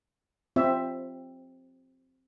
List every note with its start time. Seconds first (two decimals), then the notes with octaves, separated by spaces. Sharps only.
0.56 C4 F4 E5